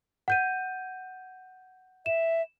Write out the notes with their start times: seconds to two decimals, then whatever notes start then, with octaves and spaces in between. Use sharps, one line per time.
0.28 F#5 G6 D#7
2.06 E5 E7